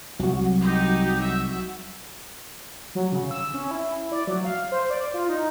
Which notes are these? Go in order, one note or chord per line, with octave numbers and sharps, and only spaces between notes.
C2 F#3 F#4
D#4 G4
E5
F#3
C#3
E6
C#4
E4
D5
F#3
F5
C5
D5
F4
D#4